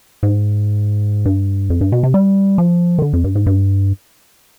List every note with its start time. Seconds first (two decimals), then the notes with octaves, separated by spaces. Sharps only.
0.23 G#2
1.26 G2
1.70 F2
1.81 G2
1.92 B2
2.03 C3
2.14 G3
2.58 F3
2.98 D#3
3.02 D3
3.13 F2
3.24 G2
3.35 G#2
3.46 G2